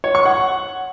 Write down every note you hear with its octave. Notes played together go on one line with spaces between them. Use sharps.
C#5
C#6
F#5